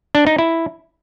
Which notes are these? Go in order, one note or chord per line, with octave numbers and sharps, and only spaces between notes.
D4
D#4
E4